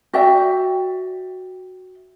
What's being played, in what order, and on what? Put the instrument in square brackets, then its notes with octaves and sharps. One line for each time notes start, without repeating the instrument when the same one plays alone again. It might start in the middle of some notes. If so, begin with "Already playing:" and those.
[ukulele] F#4 D5 E5 G5